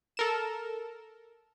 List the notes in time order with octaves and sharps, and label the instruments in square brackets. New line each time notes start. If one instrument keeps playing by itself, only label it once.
[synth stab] A4 A#4 E7